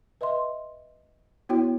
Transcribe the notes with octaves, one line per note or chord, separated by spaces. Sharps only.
B4 D#5 E5 C6
B3 E4 F#4 C#5 G5